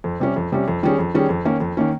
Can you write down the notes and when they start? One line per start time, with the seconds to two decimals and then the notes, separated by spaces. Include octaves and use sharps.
0.04 F2
0.20 C3 G3 C#4
0.36 F2
0.52 C3 G3 C#4
0.68 F2
0.83 D#3 G3 C#4 G#4
0.98 F2
1.14 D#3 G3 C#4 G#4
1.29 F2
1.45 D#3 A#3 C#4
1.60 F2
1.77 D#3 A#3 C#4